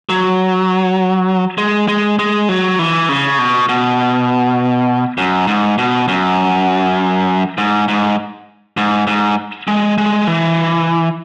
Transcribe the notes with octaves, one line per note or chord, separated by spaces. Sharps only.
F#3
G#3
G#3
G#3
F#3
E3
C#3
B2
B2
F#2
G#2
B2
F#2
G#2
G#2
G#2
G#2
G#3
G#3
E3